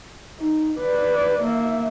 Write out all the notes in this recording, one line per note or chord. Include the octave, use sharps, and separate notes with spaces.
D#4
B4 D5
A#3 E5